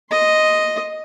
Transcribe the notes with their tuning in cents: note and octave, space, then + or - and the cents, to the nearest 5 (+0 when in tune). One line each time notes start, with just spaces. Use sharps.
D#5 +0 C6 +0